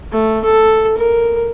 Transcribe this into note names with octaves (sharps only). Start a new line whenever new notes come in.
A3
A4
A#4